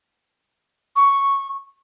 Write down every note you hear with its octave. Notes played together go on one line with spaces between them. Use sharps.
C#6